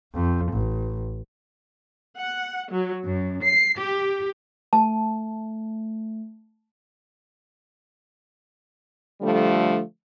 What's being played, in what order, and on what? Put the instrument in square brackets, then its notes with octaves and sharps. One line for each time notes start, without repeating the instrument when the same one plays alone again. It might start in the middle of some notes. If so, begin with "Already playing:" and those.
[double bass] F2
A1
[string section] F#5
F#3
F#2
C7
G4
[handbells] A3 [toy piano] A5
[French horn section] D3 F3 G3 A3